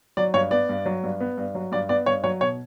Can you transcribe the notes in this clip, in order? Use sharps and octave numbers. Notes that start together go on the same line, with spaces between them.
F#3 D5
G2 C#5
B3 D5
G2
F#3
G2
B3
G2
F#3
G2 D5
B3 D5
G2 C#5
F#3 C#5
B2 C#5